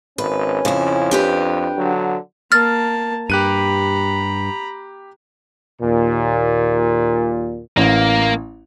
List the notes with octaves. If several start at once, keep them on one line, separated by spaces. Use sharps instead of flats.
G#1 C#4 B4
F2 C#3 E4
D4 G4 B4
D3 F#3
A#3 A5 F6 A6
G2 G4 A#5 B5 F#6 D#7
D#2 A#2
A1 A#3